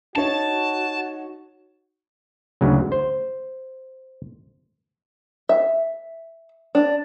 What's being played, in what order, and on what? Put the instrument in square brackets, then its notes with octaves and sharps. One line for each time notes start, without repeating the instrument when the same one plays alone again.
[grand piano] D#4 C#5 [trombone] F#4 [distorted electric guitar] A5
[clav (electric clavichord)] D2 C#3 F#3
C5
[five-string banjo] E5
D4